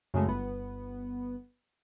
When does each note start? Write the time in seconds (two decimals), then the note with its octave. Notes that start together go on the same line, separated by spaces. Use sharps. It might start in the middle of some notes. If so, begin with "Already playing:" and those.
0.14 F#2 C#3 G#3 A3
0.28 G1 B3